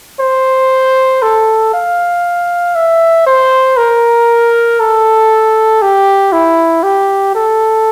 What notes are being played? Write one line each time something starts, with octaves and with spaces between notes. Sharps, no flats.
C5
A4
F5
E5
C5
A#4
A4
G4
E4
G4
A4